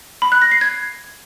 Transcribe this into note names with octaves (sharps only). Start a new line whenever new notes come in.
B5
F#6
A#6
C7
G#6